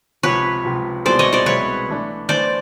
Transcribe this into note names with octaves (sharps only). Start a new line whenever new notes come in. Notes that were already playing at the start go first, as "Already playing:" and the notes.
C#2 C3 F3 B4 C#5
C#2 C3 F3
C2 B2 G#3 B3 E4 C5 D5
C#5 D#5
C5 D5
C2 B2 G#3 B3 E4 B4 C#5
E3 A3 D4
E3 A3 D4 C5 D5